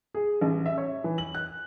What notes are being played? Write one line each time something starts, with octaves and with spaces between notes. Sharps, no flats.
G#4
A1
E5
C#5
E3
F#7
F#6